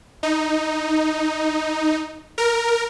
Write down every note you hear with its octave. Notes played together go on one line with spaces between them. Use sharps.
D#4
A#4